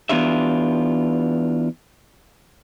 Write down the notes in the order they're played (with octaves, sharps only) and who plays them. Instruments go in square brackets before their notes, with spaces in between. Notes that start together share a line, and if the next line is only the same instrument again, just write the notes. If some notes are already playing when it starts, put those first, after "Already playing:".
[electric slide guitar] E3 B3 D4 F4 G4 E5